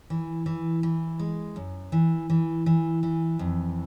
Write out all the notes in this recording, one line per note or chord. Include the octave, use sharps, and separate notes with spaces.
E3
E3
E3
G#3
F#2
E3
E3
E3
E3
F2